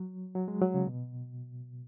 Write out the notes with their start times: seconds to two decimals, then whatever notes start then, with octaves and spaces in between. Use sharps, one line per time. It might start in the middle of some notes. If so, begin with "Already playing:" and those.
Already playing: F#3
0.35 F#3
0.48 G#3
0.62 F#3
0.74 C#3
0.87 B2